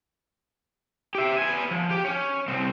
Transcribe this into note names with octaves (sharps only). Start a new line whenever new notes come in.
G4 E5
B3 G#5
F3
G4
C#4
C2 C4